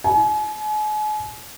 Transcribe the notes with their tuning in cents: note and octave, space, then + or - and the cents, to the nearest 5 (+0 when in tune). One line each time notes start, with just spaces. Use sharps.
G#5 +40